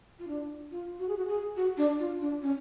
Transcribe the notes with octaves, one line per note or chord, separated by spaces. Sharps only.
F4
D4
F4
F#4
G#4
F#4
G#4
F#4
D4
F4
D4
C#4